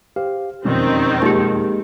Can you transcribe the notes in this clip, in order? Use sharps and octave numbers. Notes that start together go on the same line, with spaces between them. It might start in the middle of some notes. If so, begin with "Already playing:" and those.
G4 C5 F5
E1 F2 D#3 G3 C4 C#4
G#3 A#3 D#4 G4